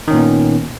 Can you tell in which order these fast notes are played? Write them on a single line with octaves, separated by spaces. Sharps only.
D#3 C#4 A#2 B3